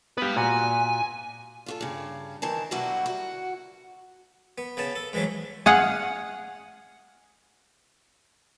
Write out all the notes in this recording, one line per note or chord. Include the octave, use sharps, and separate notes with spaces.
B3 G4 B4 F5
A#2 F#4 G#5
F4 F#4 A4
G2 C#3
D#3 E3 A#4 A5
B2 D3 F#3 G3 E4 F#4
F#4
B3
C#3 B3 A5
A4
G#2 E3 F#3 A3
G#4 F5 F#5